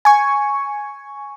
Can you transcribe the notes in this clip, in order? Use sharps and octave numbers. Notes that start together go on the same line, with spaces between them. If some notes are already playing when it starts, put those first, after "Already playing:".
G#5 C#6